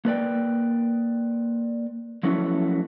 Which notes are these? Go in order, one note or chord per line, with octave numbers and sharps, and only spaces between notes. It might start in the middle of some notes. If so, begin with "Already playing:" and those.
A#3 B4 D5 G5
F3 F#3 A3 B3 C#4 E4